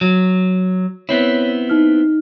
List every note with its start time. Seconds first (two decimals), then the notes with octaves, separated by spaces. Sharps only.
0.01 F#3
1.09 B3 C4 E4 C#5
1.69 D#4 F6